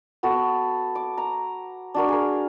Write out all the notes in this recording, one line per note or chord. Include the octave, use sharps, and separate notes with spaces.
B3 F#4 A4
D6
A#5
D4 F#4 A#4
G#4 A#4